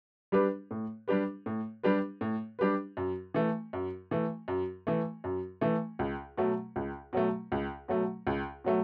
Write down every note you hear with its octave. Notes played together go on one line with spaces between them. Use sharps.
G3 D4 G4 B4
A2
G3 D4 G4 B4
A2
G3 D4 G4 B4
A2
G3 D4 G4 B4
F#2
E3 A3
F#2
E3 A3
F#2
E3 A3
F#2
E3 A3
C#2
B2 F#3 A3
C#2
B2 F#3 A3
C#2
B2 F#3 A3
C#2
B2 F#3 A3